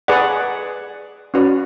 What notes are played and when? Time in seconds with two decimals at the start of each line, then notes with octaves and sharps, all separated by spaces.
0.08 G#4 B4 D5 F#5
1.34 C#4 F#4 B4 D5